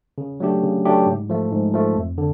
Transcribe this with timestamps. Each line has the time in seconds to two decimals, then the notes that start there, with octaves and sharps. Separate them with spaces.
0.18 C#3
0.40 F#3 A3 D4 G4
0.63 C#3
0.85 F#3 A3 D4 G4
1.07 G#2
1.30 F3 A3
1.52 G#2
1.74 F3 A3
1.96 F2
2.18 D3